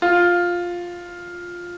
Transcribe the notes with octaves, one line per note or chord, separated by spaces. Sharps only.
F4